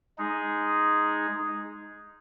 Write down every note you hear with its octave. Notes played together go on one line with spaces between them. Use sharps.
G#3 D#4 G#4